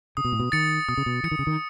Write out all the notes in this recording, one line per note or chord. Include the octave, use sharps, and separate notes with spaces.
C#3 D#6
B2
A2
B2
D#3 A6 C#7
B2 D#6
C#3
B2
E3 A6 C#7
D#3
C#3
D#3